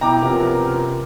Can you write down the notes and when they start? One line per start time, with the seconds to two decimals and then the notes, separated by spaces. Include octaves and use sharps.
0.01 B2 E4 G5 A#5 D6
0.22 C3 F3 B3 C#4 A#4